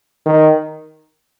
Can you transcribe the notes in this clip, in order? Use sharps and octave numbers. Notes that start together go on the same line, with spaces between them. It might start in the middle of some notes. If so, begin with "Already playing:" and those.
D#3